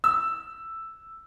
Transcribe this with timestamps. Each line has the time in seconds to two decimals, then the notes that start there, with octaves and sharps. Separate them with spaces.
0.04 E6